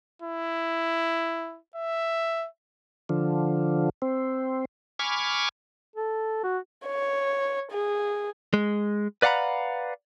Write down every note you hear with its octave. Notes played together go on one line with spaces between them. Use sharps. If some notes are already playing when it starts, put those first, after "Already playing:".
E4
E5
D3 F3
C4
G#5 B5 C#6 D6 F6 G#6
A4
F#4
C#5
G#4
G#3
B4 D5 F5 F#5 A#5 B5